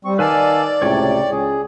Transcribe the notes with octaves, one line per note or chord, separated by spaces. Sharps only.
G3 C4 C#6
D#3 B4 D5 F5 G#5 A5 E6
C#2 A2 C3 C#5 G5
C#2 G#4